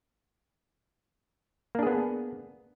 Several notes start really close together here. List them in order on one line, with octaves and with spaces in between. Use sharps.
A#3 D4 G#4 B3